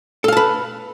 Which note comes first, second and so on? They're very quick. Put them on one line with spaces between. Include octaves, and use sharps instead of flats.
A4 F5 A5 B4